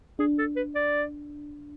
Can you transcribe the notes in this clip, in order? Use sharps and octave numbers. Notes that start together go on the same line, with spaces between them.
D4 G#4
A4
B4
D5